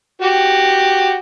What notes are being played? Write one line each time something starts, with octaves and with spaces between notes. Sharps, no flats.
F#4 G4